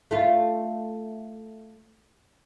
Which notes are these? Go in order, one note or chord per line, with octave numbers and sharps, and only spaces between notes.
A3 F4